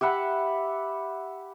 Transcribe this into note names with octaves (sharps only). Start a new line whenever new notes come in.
G4 E5 F#5 B5